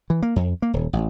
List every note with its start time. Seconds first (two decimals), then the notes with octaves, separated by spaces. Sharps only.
0.10 E3
0.23 A#3
0.36 F2
0.62 A#3
0.73 D#1
0.93 A1